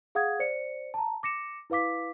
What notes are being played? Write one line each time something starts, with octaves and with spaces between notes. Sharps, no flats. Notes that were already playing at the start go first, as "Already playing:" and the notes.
G#4 F5 F#5 D#6 G#6
C5 D5 C#7
A5 A#5
D6 A#6 C#7 E7
E4 B4 F5 D6 B6